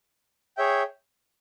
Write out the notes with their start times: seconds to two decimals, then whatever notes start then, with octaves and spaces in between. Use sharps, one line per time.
0.57 G#4 C#5 E5 G5